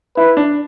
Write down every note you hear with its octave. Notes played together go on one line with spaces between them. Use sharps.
E4 B4
D4